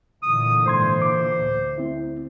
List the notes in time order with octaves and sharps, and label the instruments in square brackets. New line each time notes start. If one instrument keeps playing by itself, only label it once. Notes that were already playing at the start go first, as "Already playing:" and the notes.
[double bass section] A#2 D3 E3 [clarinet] D#6
[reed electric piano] G#2 C6 G#6 [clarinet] C5
[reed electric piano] D6
[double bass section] D2
[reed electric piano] C4 E4